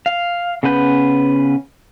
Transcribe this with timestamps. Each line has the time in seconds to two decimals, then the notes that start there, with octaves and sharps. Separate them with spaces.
0.06 F5
0.63 C#3 B3 C#4 B4 G6